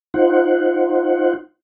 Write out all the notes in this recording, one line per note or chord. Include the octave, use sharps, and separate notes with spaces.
D#4 F4 C5 F#5